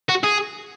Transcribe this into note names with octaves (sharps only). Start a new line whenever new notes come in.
F#4
G#4